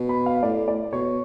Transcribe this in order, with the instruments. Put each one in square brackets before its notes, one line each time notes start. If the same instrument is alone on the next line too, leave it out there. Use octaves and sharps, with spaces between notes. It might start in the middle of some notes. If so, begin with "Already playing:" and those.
Already playing: [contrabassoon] B2
[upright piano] B5
F5
[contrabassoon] A2 [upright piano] D5
[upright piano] D5
[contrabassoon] B2 [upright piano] C#5